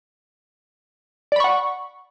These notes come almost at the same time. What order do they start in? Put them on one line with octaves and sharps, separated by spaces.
D5 B5 C#6 F#5